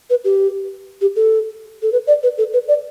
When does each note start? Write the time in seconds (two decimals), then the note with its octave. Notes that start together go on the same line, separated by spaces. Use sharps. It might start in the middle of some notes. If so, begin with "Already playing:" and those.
0.10 B4
0.25 G4
1.01 G4
1.16 A4
1.82 A4
1.92 B4
2.07 D5
2.23 B4
2.38 A4
2.53 B4
2.68 D5